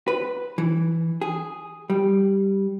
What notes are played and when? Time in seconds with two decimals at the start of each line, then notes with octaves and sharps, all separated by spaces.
0.08 B4
0.58 E3
1.21 G#4
1.90 G3